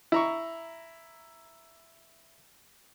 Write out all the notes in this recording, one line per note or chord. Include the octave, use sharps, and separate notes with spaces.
E4 A#5 C#6